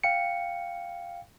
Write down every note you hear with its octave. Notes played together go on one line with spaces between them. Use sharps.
F5 G5 C#7